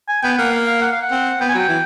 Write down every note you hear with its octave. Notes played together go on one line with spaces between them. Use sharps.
G#5
B3 G5
G5
A#3 F#5
F5
F5
F#5
F5
F#5
C4
B3 G5
G#5
F#3 G5
E3